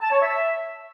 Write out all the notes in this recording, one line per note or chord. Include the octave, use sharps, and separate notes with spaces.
A5
C#5
E5